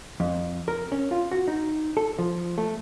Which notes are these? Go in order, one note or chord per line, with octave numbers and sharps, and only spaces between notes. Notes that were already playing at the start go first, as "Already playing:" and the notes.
F2
A#4
C#4
F4
F#4
D#4
A4
F3
A3